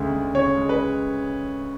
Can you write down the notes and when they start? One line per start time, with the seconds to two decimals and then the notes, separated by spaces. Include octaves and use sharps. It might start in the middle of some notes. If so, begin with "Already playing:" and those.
Already playing: D2 C#3 G#3
0.13 D2
0.35 C#3 C#5
0.57 G#3
0.69 B4